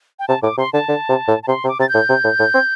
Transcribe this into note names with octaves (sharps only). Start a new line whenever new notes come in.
G5
C3 A5
A2 D6
C3 C6
D3 A5
D3
C3
A2
A5
C3 C6
C3
D6
C3 A6
G6
A2
C3
A2
A2
C4